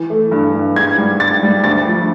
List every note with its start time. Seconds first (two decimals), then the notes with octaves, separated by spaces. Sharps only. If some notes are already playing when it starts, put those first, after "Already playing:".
Already playing: E3
0.10 A3
0.31 G2
0.55 G2
0.76 G#2 G#6
0.98 G3
1.20 G#2 A6
1.43 G3
1.64 D2 A6
1.86 F3